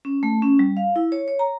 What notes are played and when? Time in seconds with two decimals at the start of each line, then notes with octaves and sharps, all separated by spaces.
0.05 C#4
0.23 A3
0.42 C#4
0.59 G3
0.77 F5
0.96 E4
1.12 C#5
1.28 C#5
1.39 A#5